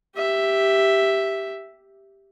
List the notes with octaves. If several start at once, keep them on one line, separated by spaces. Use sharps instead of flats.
G4 E5